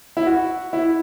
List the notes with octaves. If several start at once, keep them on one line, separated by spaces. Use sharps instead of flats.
E4
F#4
E4